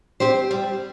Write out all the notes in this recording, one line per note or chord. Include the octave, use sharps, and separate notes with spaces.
C4 G4 C5
G3